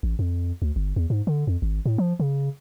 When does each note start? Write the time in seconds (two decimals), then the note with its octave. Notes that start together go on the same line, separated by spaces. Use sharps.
0.03 A1
0.19 F2
0.62 D2
0.76 G1
0.96 E2
1.10 G#2
1.27 D3
1.47 F2
1.62 G#1
1.86 A2
1.98 F3
2.20 C#3